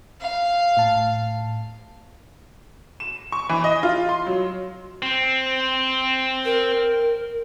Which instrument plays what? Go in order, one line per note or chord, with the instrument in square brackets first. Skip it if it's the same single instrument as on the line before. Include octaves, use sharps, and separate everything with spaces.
[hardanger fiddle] F5
[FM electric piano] A2 A5
[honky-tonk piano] E7
C#6
E3
D#5
F4
C6
F#3
[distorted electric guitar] C4
[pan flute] A#4